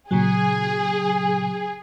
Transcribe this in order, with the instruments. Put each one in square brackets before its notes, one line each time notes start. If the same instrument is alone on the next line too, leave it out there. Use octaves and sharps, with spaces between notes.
[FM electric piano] A#2 C#3 F#3 [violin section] G#4